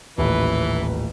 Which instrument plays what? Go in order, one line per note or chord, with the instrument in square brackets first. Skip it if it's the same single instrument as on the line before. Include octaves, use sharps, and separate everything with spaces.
[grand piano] D#1 A1 [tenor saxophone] E3 [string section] B4